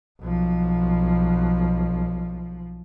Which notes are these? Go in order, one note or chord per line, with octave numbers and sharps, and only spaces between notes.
B1 F3